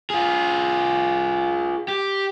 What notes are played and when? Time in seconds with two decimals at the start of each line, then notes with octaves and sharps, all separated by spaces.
0.10 F4 G#4
1.88 G4